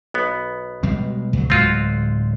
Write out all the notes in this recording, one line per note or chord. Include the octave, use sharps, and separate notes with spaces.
B1 B3
B2 G3 G#3
C#2 F#3
D1 G#3 C4 F4 F#4